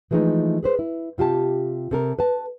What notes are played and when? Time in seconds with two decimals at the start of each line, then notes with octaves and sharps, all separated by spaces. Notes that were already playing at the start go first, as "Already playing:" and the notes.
0.11 E3 F3 G#3 A3 D#4
0.63 G#4 B4 C5
0.79 E4
1.18 C3 F4 G4 A5
1.91 C3 A4 A#4
2.19 B4 A5